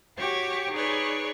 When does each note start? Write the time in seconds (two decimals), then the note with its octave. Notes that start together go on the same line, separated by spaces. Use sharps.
0.17 F#4 G4 C#5 D6
0.73 D#4 G#4 B4 C#5 D5